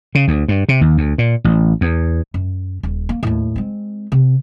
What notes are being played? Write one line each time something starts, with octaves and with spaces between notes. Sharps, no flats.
C#3
D2
G2
C3
D#2
D2
A#2
A1
E2
F#2
D#1
A#3
D#2 A2
G#3 C4
C3